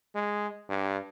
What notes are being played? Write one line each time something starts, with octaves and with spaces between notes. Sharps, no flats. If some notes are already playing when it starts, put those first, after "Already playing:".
G#3
G2